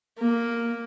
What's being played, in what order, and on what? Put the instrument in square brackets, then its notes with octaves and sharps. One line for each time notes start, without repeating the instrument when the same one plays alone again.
[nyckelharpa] A#3